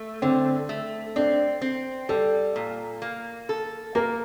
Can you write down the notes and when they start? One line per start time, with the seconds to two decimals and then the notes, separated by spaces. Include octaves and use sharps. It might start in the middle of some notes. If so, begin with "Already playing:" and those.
Already playing: A3
0.22 D3 C4
0.69 A3
1.16 C4 D4
1.61 C4
2.09 G3 A4
2.56 A#2
3.02 A#3
3.49 A4
3.95 A#3 A#4